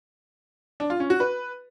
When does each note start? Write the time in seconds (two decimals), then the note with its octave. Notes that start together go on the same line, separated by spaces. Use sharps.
0.80 D4
0.90 F4
1.00 C#4
1.10 F#4
1.20 B4